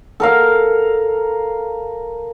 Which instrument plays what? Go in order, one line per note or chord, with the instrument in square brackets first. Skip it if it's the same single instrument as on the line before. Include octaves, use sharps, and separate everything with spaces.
[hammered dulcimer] A4 A#4 F5